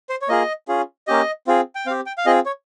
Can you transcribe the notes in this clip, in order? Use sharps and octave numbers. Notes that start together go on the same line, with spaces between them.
C5
C#5
A#3 F4 G#4 D#5
C#4 F4 G#4
A#3 C#4 G4 D#5
C4 F4 G#4
G5
C4 G4 F5
G5
F5
C4 F4 G#4 D#5
C#5